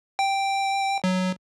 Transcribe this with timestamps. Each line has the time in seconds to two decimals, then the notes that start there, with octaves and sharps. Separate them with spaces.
0.19 G5
1.04 F#3